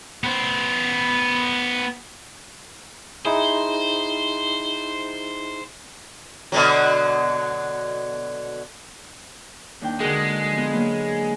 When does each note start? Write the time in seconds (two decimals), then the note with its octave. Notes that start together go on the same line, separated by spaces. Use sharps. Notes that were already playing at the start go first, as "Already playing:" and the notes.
0.24 B3 C5
3.25 D#4 E4 G#4 C5
6.52 B2 D3 F#3
9.81 D#2 D4 G5
10.00 D3 G#3 F#4 A#4
10.52 F3 B3
10.73 F#3 A#3 B4